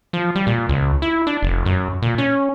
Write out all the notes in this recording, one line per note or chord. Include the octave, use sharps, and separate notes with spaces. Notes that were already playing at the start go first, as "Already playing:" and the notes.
F3
G3
A#2
C#2
E4
D4
F1
F#2
A#2
C#4